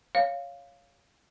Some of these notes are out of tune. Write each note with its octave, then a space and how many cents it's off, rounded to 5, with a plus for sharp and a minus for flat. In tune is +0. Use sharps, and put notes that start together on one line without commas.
C#5 +10 F5 +0